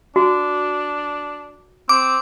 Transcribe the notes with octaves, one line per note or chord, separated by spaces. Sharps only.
D4 F#4
C4 D6